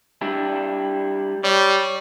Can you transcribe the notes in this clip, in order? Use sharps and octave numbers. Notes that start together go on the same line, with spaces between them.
G3 D4 E4
G3 C#5 D5